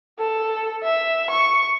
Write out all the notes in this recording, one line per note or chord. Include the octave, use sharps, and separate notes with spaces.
A4
E5
C#6